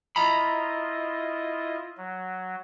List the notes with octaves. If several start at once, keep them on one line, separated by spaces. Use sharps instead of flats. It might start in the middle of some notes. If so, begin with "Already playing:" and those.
E4 F4 D#5 A#5 B5
F#3